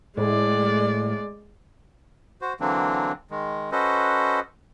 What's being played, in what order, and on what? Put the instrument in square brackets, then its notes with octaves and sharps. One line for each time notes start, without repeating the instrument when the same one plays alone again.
[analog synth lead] A2 [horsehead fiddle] G#3 D5
[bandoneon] F#4 C5
D3 E3 F#3 A#3 C4 D4
D#3 G#3
C#4 F#4 A4 B4 C5 D#5